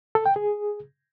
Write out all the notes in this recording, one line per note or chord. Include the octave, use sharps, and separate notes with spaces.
A4
G5
G#4